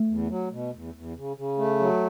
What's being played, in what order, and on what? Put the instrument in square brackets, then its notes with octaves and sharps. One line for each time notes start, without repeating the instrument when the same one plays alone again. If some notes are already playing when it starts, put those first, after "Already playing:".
Already playing: [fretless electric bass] A3
[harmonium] E2
F#3
B2
E2
E2
C#3
C#3
A3
F#3